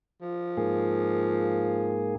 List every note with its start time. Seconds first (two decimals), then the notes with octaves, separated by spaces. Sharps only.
0.22 F3
0.57 G#2 A#3 G#4